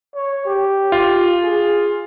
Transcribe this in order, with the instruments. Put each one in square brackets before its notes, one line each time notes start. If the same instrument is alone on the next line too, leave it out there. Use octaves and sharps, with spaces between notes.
[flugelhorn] C#5
G4
[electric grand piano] F4
[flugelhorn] G#4